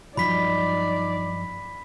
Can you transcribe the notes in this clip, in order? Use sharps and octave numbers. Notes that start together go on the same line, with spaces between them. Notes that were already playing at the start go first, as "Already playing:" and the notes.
G2 F3 F#3 D#4 D5 B5 B6